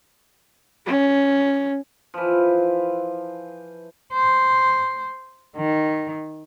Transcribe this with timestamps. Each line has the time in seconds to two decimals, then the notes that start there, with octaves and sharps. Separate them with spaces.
0.87 C#4
2.14 E3 F3
4.13 C5
5.56 D#3